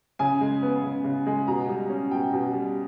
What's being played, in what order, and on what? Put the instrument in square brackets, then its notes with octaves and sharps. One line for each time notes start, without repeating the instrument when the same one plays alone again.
[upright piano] C#3 G#5
G#3
B3
C#3
C#3
G#3
B2 A#5
G3
C#4
B2 G5
B2
G3